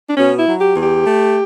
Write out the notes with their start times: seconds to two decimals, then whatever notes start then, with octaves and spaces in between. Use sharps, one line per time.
0.09 D4
0.17 B2 C#4
0.39 E4
0.47 F#3
0.61 G4
0.76 E2
0.83 G4
1.05 A3